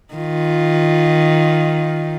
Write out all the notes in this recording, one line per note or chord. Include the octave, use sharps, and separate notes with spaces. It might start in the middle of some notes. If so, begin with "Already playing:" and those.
D#3 F4